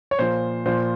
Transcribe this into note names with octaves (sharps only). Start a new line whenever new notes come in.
C#5
A#2 F3 C5
A#2 F3 C5